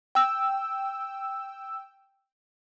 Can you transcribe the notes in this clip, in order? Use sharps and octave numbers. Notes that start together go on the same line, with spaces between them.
G5 E6